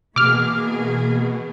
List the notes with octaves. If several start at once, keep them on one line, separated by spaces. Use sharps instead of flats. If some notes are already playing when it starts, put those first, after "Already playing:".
B2 E3 A#3 G#4 D6 F6